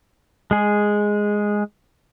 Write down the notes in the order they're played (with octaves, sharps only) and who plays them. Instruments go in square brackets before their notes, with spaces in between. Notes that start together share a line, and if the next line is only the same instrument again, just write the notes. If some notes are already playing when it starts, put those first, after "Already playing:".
[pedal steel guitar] G#3 G#4